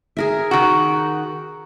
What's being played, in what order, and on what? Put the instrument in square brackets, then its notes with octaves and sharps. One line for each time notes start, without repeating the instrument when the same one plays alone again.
[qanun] G#4 A#4 E5
[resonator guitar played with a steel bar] D#3 F#4